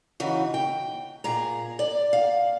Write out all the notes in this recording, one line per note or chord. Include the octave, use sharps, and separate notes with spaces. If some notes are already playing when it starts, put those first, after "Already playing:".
C#3 E3 D#4 F#4
G5
A#2 G#4 A#5
D5
F5